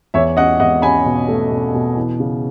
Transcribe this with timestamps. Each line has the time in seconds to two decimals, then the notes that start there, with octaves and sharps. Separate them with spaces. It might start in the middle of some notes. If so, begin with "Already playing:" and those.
0.14 E2 C#5 E5
0.37 C#4 D#5 F#5
0.60 E2 D#5 F#5
0.82 C#4 G#5 B5
1.06 B2
1.28 A3
1.51 B2
1.74 B2
1.96 E3
2.20 C#3